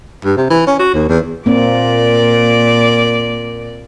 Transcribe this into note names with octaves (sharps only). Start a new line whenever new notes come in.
G2
C3
E3
C#4
F#4
D#2
E2
A#2 A#3 C4 D5